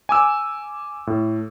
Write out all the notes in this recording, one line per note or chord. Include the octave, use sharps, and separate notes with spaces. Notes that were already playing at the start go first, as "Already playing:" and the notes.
G#5 D6 E6
A2